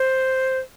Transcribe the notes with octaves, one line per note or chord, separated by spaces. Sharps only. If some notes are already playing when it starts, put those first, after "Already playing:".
Already playing: C5